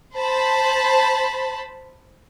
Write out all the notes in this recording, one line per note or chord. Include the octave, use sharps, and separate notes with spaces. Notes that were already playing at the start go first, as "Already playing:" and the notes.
C5 A5 B5